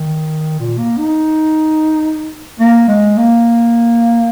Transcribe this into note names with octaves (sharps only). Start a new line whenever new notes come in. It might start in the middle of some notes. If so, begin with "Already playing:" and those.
Already playing: D#3
A#2
A#3
D#4
A#3
G#3
A#3